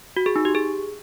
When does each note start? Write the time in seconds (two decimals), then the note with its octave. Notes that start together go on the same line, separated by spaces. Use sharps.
0.17 F#4
0.26 G#4
0.36 D#4
0.45 G4
0.55 G#4